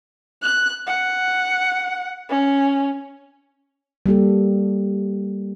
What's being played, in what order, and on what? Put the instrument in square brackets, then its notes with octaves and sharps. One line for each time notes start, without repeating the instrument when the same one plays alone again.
[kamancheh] F#6
F#5
C#4
[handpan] G3 A#3 G4 A4